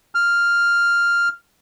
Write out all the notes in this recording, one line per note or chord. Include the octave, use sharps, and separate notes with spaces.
F6